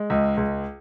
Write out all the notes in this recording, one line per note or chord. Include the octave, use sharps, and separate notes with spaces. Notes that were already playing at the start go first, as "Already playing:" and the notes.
Already playing: G#3
C#2
C#2